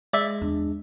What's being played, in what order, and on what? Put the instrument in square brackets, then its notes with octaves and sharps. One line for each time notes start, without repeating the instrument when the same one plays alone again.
[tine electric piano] G#3 [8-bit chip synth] D5 E5
[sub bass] E2 [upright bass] D4